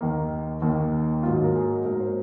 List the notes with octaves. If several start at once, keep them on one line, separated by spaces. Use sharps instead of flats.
D#2 D#3 A#3
D#2 D#3 A#3
G#2 F#3 A#3 F4
A#4
G#4
G#2 F#3 A#3 A#4
C5